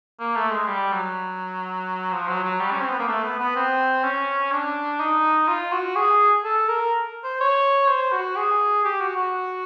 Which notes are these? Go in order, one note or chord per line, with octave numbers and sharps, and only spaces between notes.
A#3
A3
G#3
G3
F#3
F3
F#3
F#3
G3
C#4
C4
B3
A#3
A3
B3
B3
C4
C#4
D4
D#4
F4
F#4
G#4
A4
A#4
C5
C#5
C5
F#4
G#4
G4
F#4
F#4